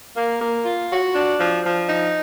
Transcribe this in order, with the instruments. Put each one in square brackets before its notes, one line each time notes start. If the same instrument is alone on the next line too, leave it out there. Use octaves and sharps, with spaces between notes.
[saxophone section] A#3
A#3
F4
F#4
D4
F3
F3
D#4